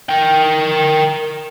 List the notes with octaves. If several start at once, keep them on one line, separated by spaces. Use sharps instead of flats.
A#4 G5